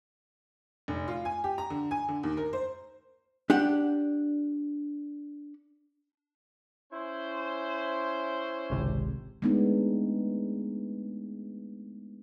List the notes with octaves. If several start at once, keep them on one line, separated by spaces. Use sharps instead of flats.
F1
F4
G#5
G4
A#5
D3
G#5
D3
D#2
A#4
C5
D4 G4 F#5
C#4 E4 C5
G#1 C#2 C3
G#3 A3 B3 C4 D4 D#4